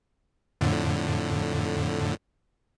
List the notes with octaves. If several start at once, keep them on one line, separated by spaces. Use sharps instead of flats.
F2 A2 D3